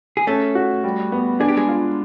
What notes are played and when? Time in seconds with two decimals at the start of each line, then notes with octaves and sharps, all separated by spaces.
0.17 G#4
0.27 A3 C#4 A4
0.55 F#4
0.84 G3
1.12 B3
1.40 D4 G#4
1.48 G4
1.57 G#3 G#4
1.68 F4